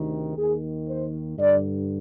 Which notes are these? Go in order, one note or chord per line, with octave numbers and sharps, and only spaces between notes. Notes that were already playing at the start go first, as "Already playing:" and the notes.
Already playing: D2 C3 D#3
D#2 D#3 G#4
C5
G2 D3 D5